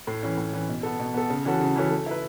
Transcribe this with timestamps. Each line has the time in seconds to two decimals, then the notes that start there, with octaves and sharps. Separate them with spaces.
0.07 A2
0.23 E3 C#4
0.37 A2
0.53 E3 C#4
0.69 B2
0.83 B3 A4
1.00 B2
1.14 B3 A4
1.30 C#3
1.45 E3 C#4 F#4 A4
1.60 C#3
1.76 E3 C#4 F#4 A4
1.90 A3
2.06 E4 B4